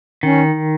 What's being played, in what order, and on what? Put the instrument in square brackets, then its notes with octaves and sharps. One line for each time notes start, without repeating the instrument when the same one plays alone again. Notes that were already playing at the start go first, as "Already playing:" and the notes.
[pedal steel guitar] D#3 [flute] C#4